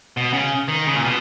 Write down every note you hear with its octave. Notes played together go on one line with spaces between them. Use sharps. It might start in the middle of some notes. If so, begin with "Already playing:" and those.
B2
C#3
D#3
C#3
A#2
B2